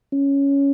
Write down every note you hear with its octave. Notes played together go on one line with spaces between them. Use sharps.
C#4